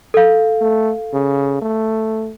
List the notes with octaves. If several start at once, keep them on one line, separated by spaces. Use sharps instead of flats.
A4 F5
A3
C#3
A3